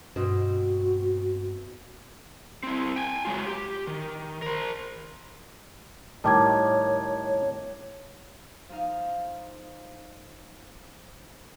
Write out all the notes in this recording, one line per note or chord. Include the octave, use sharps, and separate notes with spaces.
G2 B2 C4 F#4
C4 E4
G5 G#5
F#3 G#3 F4
G4
D#3
A#4 C5
A2 D#3 G3 C#5 A5 D6 G#6
C#5
F3 D#4 F5